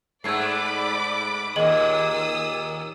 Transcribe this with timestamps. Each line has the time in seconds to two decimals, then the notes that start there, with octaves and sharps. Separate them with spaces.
0.24 G#2 A3 D5 B5 D6 E6 G#6 C7
1.56 D#2 A#2 G#4 D#5 D#6 E6 F#7